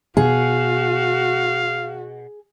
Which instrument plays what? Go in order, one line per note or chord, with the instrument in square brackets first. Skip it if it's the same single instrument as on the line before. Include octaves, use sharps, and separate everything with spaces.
[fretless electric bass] B2 [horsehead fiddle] F#4 [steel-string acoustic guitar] G#4 [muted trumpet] F5